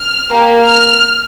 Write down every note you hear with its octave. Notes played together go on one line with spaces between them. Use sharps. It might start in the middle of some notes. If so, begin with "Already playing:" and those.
Already playing: F6
A#3 G4
F6